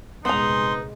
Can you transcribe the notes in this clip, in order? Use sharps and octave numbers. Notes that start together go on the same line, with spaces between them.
F1 A#2 G#3 B3 D#4 A#5 C6